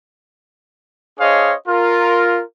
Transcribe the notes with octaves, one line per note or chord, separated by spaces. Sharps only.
D4 G#4 C5 C#5 D#5 F5
F4 A#4